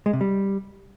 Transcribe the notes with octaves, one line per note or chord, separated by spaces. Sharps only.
G#3
C3
G3